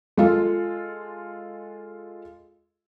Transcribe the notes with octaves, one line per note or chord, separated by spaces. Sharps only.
G#3 F4 A4